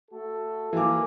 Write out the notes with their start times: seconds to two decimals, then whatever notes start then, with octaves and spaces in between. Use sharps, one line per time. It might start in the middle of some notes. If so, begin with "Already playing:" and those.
0.11 A3 F#4 A4
0.73 E3 A#3 D6